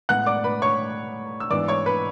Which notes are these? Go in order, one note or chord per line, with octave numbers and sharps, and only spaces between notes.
A2 G#3 B3 F#5 F#6
D5 D6
B4 B5
C#5 C#6
E6
G#2 E3 B3 D4 D5 D6
C#5 C#6
B4 B5